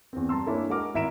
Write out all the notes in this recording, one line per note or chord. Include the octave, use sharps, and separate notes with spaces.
E2 C4
G2 A5 A#5 C6 E6
A#3 C#4 D4 E4 A4
G#3 F#4 A#4 D6 F6
G#1 E4 E5 A#5 D7 E7